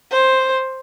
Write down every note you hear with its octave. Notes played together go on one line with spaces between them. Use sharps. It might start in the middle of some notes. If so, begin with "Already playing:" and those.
C5